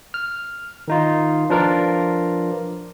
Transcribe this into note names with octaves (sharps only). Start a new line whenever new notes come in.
F6
D#3 D#4 F4
F3 D4 F4 A#4 B4 D5